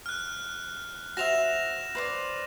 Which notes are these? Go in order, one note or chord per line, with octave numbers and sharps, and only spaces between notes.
F6 F#6
F#4 C5 E5 A#6 E7 F7
B4 C5 D5